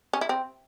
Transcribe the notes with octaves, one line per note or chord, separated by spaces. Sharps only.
C#4
E4
C4